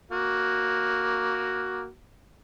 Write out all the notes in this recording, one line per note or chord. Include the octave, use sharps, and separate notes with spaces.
A#3 F#4